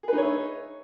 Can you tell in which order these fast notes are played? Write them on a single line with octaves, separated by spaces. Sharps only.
G#4 B4 D#4 C#5 E5